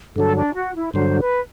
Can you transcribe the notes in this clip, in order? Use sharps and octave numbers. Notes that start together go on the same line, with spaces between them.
G2 D3 F#3 A4
D4
F#4
E4
G2 D3 F#3 C5
B4